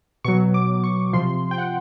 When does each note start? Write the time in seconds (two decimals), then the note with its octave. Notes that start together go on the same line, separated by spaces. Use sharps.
0.24 B2 F#3 C#6
0.54 D6
0.84 C#6
1.13 C3 F3 C6
1.51 G5
1.58 F#5